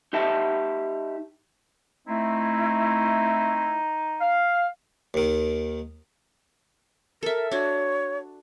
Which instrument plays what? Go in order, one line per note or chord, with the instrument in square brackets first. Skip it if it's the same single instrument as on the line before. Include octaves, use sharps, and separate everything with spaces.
[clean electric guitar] D#4 G4 E5 A5
[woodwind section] A3 C4 E4 [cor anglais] D#4
[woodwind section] F5
[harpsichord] D#2 D#3
[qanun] A4 E5 [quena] A#4
[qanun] D4 F#4 [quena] C#5